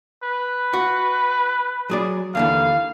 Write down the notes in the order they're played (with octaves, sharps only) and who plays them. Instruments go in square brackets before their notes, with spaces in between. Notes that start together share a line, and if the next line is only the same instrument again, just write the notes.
[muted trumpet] B4
[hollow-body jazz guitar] F#4
F#3 G#4 D5
[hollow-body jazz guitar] D#2 D3 E3 [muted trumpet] F5